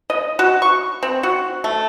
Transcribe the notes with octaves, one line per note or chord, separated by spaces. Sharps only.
D#5
F#4
C#6
C4
F#4
A3